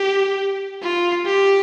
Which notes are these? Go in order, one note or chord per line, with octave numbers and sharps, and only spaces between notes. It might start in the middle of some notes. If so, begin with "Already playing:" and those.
Already playing: G4
F4
G4